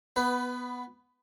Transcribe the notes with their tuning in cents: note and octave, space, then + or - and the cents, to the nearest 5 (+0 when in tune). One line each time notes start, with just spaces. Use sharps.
B3 +0 B4 +20